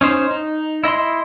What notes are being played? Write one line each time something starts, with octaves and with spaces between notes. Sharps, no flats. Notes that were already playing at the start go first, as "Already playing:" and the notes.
C#4 D#4 C5
D#4
E4 D#5 B5 C6